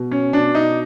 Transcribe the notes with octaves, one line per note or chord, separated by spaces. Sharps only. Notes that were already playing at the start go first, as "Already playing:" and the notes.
Already playing: B2
C#4
B2 D4
D#4